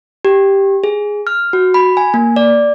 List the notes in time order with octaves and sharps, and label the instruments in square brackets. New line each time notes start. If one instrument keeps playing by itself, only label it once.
[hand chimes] G4
G#4
F6
F#4
B5
G#5
A#3
D5